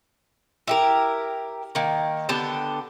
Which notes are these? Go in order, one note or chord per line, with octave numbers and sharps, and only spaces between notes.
E4 G4 A#4
D#3 A#3
D3 B3 G4 A5